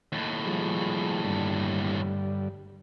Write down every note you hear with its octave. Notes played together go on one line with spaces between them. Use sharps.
D#2 A2
F3 G3 G#4
G2 D3 G3